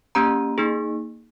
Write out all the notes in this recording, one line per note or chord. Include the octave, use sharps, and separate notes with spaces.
A#3 C#4 G4 A#5
A#3 D#4 G#4